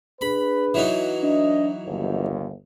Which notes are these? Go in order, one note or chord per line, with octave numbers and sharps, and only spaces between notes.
D4 G#4 B4 B5
E3 F#3 D#4
D4 D#5
G1 D#2